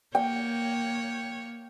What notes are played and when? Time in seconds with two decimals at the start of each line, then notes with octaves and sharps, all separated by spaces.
0.15 A#3 C#5 G5